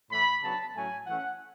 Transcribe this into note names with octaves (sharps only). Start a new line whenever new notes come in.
A2 E3 A3 B5
C#3 F#3 B3 D4 A5
A2 F#3 A3 C#4 G#5
E3 A3 C#4 F#5